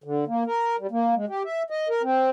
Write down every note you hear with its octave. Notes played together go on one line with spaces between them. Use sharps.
D3
A#3
A#4
G3
A#3
G#3
G4
E5
D#5
A#4
C4